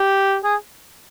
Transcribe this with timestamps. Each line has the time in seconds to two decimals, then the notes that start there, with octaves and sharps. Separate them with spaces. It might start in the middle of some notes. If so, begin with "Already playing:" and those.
Already playing: G4
0.44 G#4